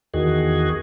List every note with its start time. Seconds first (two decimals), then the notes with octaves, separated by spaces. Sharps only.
0.14 E2 D#3 F#4 G#4